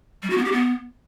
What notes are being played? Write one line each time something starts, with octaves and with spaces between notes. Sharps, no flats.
G3
F#4
B3
G4
B3